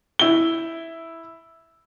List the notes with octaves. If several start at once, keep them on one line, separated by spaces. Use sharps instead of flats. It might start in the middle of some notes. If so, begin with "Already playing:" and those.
E4 G7